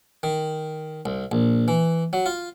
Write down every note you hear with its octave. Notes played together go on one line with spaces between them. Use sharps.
D#3
C2
A#1
E3
F#3
F4